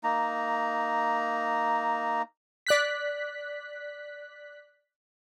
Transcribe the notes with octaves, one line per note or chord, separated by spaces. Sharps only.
A#3 D#4 A#5
D5 F#6 B6